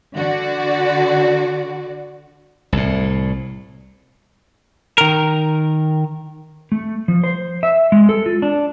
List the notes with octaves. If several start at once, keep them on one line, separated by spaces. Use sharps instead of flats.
D3 F#4 D5
C2 A2
D#3 A#4
A3
F3
C5
E5
G#3
A4
F4
D4